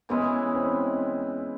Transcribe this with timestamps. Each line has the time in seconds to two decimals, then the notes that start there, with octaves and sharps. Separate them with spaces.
0.09 E3 G#3 B3 C#4 E4
0.55 C4